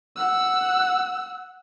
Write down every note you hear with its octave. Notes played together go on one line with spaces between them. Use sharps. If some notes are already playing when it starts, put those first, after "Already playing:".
F#5 E6